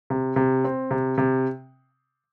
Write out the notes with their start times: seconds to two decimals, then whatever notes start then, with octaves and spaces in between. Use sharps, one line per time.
0.10 C3
0.36 C3
0.64 C4
0.91 C3
1.18 C3